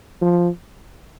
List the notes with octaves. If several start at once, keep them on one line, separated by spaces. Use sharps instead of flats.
F3